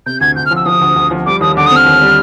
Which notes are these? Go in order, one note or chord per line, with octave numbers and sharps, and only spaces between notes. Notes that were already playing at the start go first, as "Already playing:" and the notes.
C3 G6
D2 G#6
D2 G6
F6
F3
E6
F3 D#6
D2
D2
F3
G3 D6
D#2 D#6
D3 D6
D#6
C4 F6
D#2
G3